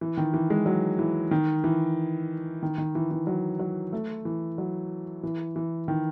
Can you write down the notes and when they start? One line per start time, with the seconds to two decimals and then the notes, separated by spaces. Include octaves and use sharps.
0.01 E3
0.17 D#3
0.34 E3
0.50 G#3
0.66 F#3
0.99 E3
1.31 D#3
1.64 E3
2.63 D#3
2.78 D#3
2.95 E3
3.11 E3
3.27 F#3
3.59 F#3
3.93 A3
4.25 E3
4.58 F#3
5.23 E3
5.56 E3
5.88 D#3